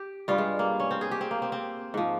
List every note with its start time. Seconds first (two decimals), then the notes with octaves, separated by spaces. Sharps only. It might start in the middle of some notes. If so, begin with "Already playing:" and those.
Already playing: G4
0.28 G2 G3 F4
0.38 G#3
0.59 A#3
0.80 C#4
0.91 C4
1.01 G#4
1.11 G4
1.21 C4
1.31 A#3
1.42 C4
1.52 C4
1.94 G#2 F3